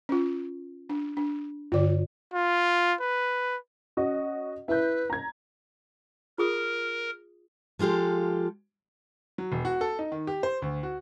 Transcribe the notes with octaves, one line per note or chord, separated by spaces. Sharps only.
C#4 F4
D4
D4
G2 D3 F4 D5
F4
B4
C#4 F#4 D#5
E4 B4 G6
A#5 G#6
F4 G#4 A#4 D#6
F3 G#3 F4 G4 A4
F#3
E1
F#4
A4
D#4
D#3
G4
C5
D2
F#4